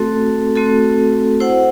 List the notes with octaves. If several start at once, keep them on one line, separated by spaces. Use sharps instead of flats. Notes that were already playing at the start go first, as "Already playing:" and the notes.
Already playing: A3 C4 F#4 A4
A3 C4 F#4 A4
E4 C5 F#5